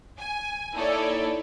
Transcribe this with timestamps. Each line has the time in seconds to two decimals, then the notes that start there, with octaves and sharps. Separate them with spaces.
0.18 G#5
0.74 A#3 D#4 E4 A4 C#5 D5